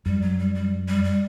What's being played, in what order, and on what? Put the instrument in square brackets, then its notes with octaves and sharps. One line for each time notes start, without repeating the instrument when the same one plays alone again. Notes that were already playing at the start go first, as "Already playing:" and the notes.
[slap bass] F#2 [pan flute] G3
[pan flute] F#3
G3
G3
G3
G3